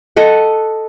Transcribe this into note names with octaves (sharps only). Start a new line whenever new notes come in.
A4 D#5 F#5